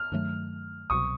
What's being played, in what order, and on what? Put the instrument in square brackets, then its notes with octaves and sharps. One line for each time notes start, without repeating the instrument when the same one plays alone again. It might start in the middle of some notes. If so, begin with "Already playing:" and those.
Already playing: [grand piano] F6
[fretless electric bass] G2 D#3 F#3 A3
[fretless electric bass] C2 B2 F#3 [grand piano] C#6 D#6